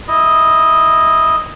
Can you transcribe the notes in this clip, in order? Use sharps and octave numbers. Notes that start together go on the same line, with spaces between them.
E4 D#5